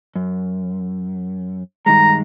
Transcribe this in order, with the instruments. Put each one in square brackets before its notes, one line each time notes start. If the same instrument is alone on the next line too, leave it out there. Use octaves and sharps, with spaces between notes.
[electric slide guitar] F#2
[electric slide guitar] G2 D#3 G#3 [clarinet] A#5